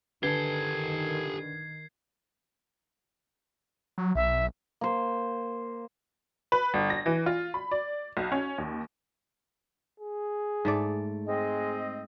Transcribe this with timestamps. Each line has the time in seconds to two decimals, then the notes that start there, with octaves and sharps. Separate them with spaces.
0.23 D3 D#3 G4 A4 B4 G#6 C7 G7
3.98 F#3
4.15 B1 E5
4.81 A#3 C5
6.52 B4
6.74 G1
6.90 A#6
7.06 E3
7.26 F4
7.54 B5
7.71 D5
8.17 B1
8.32 C#4
8.58 D#2
10.00 G#4
10.65 G#2 A3 D5
11.27 G#3 C4 D#5